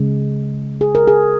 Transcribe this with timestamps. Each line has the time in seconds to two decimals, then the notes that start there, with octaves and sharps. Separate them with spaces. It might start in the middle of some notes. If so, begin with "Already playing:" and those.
Already playing: C#3 G#3
0.81 G#4
0.95 A#4
1.07 G#4